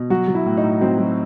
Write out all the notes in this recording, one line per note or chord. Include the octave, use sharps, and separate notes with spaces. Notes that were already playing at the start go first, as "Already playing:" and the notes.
Already playing: B2
F#3 F#4
F#3
E4
A2
D#4
A2
F#3 C4
F#3